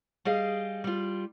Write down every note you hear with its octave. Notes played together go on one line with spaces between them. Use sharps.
G3 G#4 D#5 F5
G3 F4